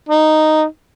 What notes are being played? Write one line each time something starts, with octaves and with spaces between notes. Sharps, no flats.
D#4